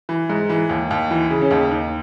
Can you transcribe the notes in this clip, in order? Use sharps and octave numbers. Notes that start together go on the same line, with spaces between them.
E3
G#2
E3
D#2
D#2
E3
C#3
C#4
D#2 D#4
D#2 D#4